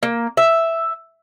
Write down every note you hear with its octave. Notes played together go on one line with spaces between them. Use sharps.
A#3
E5